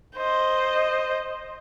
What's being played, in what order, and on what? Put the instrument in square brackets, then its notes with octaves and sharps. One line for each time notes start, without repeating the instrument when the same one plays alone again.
[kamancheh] C5 D#5